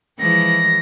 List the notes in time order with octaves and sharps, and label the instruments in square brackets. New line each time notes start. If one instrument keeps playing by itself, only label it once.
[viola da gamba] E3 F3 G#3 [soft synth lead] A#6